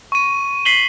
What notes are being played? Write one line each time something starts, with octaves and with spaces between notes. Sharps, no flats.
C#6 D#7
B6 C7 D#7 F#7 G7